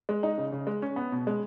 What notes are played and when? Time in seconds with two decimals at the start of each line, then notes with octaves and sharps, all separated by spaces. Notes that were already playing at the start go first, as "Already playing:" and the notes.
0.09 G#3
0.23 D#4
0.38 C#3
0.52 C#3
0.67 G#3
0.82 C#4
0.96 B3
1.12 B2
1.27 G#3